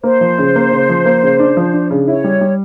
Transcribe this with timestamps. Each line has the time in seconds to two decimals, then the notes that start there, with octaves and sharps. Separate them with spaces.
0.03 A#3 C5
0.21 F3
0.38 C#3
0.55 A#3
0.72 C#3
0.89 F3
1.05 A#3
1.23 C#3
1.39 D4
1.57 F3
1.73 D4
1.91 C#3
2.07 E4 C#5
2.24 G3
2.41 G3